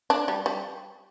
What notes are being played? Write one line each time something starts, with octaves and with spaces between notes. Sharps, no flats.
D4
G3
G3